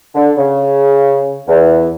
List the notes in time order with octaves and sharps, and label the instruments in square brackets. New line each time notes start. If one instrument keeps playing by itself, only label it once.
[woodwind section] D3
C#3
E2